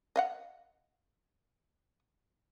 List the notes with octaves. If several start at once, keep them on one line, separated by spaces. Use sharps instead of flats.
D#5 F5 F#5